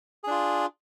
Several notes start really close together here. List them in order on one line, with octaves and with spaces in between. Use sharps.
G#4 D4 F4